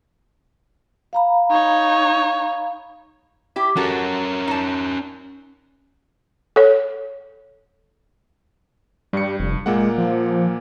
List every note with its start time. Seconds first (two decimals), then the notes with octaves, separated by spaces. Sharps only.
1.13 F5 A#5 B5
1.51 D#4 C#5
3.56 E4 G4
3.77 C#4 F#4 A4 A#4
4.48 D#4 A5
6.56 A4 C#5
9.13 G2 G3 C#7
9.40 F1
9.66 A#2 G#3 A#3 F#5
9.98 F3